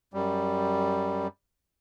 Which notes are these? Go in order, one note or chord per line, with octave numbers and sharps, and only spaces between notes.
F#2 G3